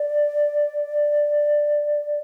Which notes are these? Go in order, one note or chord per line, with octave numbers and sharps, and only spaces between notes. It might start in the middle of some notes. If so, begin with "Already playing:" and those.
Already playing: D5